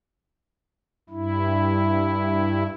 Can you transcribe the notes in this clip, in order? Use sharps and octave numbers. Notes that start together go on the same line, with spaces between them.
G2 E4